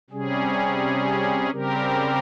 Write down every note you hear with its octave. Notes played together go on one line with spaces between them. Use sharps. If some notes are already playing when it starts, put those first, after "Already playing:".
C3 G3 C#4 G#4
C#3 G3 C4 G4 A#4